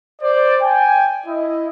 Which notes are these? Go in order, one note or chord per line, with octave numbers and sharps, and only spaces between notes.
C5 D5
G5 G#5
E4 D#5